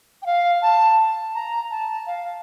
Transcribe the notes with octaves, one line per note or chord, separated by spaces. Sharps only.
G5
F5
A5
A#5
A5
F5